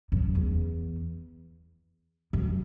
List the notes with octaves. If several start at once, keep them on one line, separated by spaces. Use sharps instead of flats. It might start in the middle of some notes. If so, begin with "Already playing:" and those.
F#2
E2
F#2